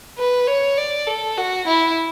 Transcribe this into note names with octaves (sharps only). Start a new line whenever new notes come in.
B4
C#5
D5
A4
F#4
E4